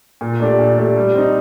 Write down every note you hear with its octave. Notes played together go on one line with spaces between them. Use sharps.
A#2
A3 D4 G4
A#2
A3 D4 G4
G3
C4 D#4